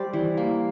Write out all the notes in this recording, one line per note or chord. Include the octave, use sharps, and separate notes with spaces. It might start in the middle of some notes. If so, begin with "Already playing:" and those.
Already playing: G3 C5 D5
E3
A#3